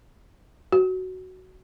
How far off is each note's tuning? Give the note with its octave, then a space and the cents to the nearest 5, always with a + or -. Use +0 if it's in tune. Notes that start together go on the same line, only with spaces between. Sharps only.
F#4 +5